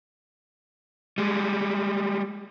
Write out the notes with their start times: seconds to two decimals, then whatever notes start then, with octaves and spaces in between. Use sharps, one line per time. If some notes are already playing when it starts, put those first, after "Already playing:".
1.18 G3 G#3